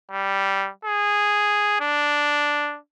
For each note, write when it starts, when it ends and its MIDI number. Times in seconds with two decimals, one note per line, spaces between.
0.11 0.69 55
0.85 1.77 68
1.80 2.77 62